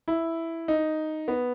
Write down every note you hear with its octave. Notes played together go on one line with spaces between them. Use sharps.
E4
D#4
B3